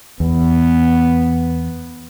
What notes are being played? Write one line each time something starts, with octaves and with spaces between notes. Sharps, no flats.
E2 B3